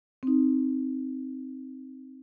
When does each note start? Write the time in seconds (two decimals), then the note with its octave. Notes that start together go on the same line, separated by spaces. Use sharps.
0.23 C4 D#4